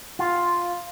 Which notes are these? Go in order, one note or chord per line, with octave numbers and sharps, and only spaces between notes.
F4